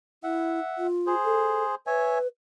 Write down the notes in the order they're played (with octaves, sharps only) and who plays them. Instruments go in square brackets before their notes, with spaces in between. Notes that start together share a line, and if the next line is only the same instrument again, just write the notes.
[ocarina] E4 [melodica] E5 F#5
[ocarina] F4
[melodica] G#4 C5
[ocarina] A4
[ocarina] B4 [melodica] C#5 E5 G#5